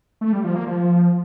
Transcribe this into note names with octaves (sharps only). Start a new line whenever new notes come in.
A3
G3
F3
A#3
F3